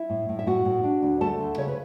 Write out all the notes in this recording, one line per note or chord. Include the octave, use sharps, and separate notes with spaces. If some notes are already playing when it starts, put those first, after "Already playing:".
Already playing: E4 E5
A2
A2
E5
A2 F#4 F#5
A2
D4
D2
A3 A4 A5
D2
C#3 C#5
B4